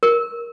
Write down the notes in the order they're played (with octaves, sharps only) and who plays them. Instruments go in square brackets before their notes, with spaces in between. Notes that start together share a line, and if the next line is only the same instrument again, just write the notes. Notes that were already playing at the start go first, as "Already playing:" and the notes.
[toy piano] A#4